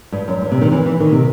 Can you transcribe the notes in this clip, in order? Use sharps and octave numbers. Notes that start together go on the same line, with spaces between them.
G2
F#2
G2
C3
D#3
E3
E3
D#3
C3